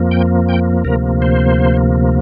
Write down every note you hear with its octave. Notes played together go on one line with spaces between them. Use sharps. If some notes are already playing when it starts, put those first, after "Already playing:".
Already playing: F2 F3 A#3
G5
G5
D2 C3 F3 A#3 A#4
C5